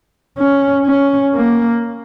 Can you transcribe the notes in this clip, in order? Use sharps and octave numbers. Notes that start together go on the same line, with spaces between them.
C#4
C#4
A#3